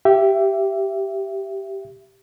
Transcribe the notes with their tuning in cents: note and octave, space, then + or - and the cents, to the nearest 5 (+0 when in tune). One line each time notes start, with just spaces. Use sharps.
G4 -10 E5 +20